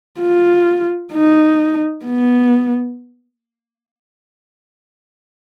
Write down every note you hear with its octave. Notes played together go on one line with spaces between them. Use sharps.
F4
D#4
B3